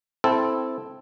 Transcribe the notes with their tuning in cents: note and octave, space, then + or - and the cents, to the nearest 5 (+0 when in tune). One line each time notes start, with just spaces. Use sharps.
C4 +0 E4 +0 A4 -5